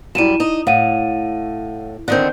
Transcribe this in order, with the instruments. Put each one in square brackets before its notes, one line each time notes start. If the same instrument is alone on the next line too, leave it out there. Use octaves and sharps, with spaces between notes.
[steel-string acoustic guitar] F#2 G3 [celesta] E4 D#7 E7
[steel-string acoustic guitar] D#4
[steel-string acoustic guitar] A2 [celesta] F5 F#5 D#7
[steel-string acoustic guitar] D3 D#3 C4 [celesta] F#6 G6